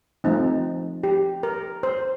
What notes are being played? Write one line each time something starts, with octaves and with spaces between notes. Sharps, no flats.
F3 A3 C4 D#4
G4
A#4
C5